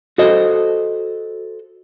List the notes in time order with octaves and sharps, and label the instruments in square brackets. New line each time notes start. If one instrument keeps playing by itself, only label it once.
[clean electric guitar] F#4 A4 C5 D#5